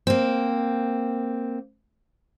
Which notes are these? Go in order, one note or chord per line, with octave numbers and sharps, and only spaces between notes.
A#3 C4